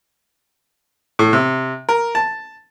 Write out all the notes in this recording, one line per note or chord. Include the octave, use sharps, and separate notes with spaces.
A2
C3
A#4
A5